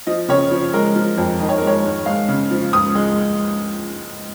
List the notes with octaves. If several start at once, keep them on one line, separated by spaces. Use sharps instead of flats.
F3 D#5
C#3 C#5
F3
G#3 A#4
F3
F2
D#3 D#5
C#5
G#3 A#4
C#5
G#2
G#3 F5
C#3
F3
C#2 D#6
G#3